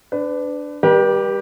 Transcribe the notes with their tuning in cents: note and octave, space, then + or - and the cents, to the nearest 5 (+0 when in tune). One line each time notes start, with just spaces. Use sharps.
D4 +0 B4 +30
G3 +25 G4 +0 B4 -45